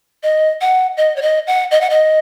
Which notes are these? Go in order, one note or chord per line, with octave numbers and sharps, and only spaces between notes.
D#5
F#5
D#5
C#5
D#5
F#5
D#5
F#5
D#5